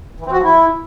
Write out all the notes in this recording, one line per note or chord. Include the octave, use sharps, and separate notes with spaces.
E3
C4
F#4
F3
E4